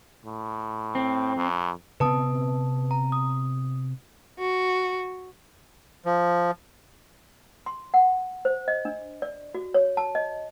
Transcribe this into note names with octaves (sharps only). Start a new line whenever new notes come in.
A2
C4
F2
C3 B3 C4 B4 A5 D#6
A#5
D#6
F#4
F3
C6
F#5
C5
D#5
D4
D5
F#4
C#5
A5
D#5